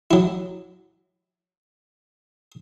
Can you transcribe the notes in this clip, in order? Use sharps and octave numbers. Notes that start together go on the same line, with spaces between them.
F#3 E4